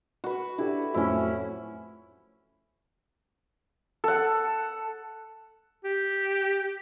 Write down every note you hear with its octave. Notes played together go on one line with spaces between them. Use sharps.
F#4 B4
D4 E4 G4 A4
F2 A2 F#3 C#4 E4
A4 F#5
G4